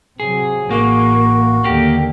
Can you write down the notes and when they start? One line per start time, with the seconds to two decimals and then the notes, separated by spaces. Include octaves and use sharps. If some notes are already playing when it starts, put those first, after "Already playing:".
0.20 C3 F#3 G#4
0.70 A1 A2 A#3 F#4
1.64 D#2 D3 A#3 G4